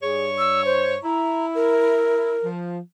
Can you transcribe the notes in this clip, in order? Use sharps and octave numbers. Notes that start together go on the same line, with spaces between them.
G2 G#4 C#5
E6
C5
E4 A#5
A#4
F3